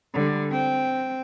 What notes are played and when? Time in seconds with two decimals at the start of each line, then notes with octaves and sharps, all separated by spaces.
0.14 D3 G3
0.50 C4 G5